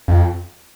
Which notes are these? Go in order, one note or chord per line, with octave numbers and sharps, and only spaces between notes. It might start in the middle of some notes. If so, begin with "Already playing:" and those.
F2